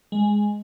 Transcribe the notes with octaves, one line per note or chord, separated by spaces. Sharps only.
G#3